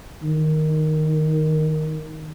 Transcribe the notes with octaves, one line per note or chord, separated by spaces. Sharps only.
D#3